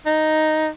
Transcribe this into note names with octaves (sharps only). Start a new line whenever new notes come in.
D#4